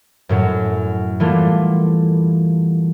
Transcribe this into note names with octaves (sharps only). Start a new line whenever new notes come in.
F#2 A2 F#3
E3 G3 A3 A#3 F4